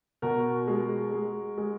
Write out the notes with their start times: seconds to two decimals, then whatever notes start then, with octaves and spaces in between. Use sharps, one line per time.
0.22 B2 F#4 A#4
0.67 G#3
1.12 G#3
1.58 G#3